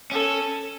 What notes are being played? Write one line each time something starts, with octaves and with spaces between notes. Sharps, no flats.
C#4 A4